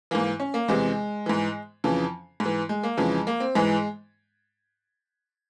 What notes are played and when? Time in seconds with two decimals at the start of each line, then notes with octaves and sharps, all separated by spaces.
0.11 G#2 E3 A#3
0.40 C#4
0.54 A#3
0.68 E2 C3 E3 G#3
1.26 G#2 E3
1.84 F2 C#3 E3
2.40 G#2
2.46 E3
2.69 G#3
2.83 A#3
2.97 F2 C#3 E3 G#3
3.27 A#3
3.40 C4
3.55 G#2 E3 G#3